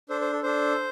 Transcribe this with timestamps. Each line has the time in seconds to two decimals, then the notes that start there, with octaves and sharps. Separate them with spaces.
0.09 D4 A4 C5
0.21 C5
0.33 A4
0.43 D4 A4 C5